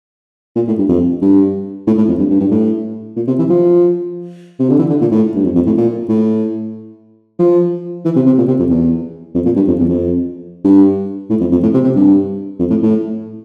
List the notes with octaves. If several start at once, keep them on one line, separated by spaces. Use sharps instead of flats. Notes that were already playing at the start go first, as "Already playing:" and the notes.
A#2
A2
G2
F2
G2
A2
A2
F2
G2
G2
G2
A2
A#2
C3
E3
F3
C3
D3
E3
D3
A#2
A2
G2
F2
F2
A2
A#2
A2
F3
E3
C3
C3
A#2
C3
F2
E2
F2
A#2
G2
F2
E2
F2
G2
A2
F2
F2
A2
C3
C3
G2
F2
A2
A2